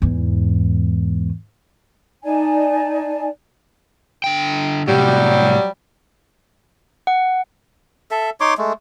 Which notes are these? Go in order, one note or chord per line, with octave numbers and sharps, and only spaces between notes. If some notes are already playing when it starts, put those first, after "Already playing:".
E2 G#2
D#4 D5 G#5 A5
D3 G5
A2 C3 F#3 G3
F#5
A4 E5
D#4 C#5 C6 D6
G#3 A3